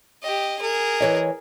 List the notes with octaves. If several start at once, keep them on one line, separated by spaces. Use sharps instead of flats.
G4 D#5
G#4 A#4
E3 C#5 D#5